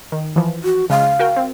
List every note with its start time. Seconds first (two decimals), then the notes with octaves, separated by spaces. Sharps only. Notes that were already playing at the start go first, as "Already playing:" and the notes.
0.12 D#3
0.36 E3 F3
0.64 F#4
0.90 C#3 G#3 F5
1.19 F#4 A#4 G5
1.36 C4